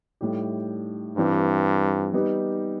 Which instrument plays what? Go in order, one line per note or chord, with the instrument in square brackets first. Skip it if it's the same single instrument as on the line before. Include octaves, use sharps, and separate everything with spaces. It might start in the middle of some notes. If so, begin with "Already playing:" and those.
[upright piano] A2 G3 D#4 G4
[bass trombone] G2 [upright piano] E3 G3 C4
[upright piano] G3 B3 D#4 G4 B4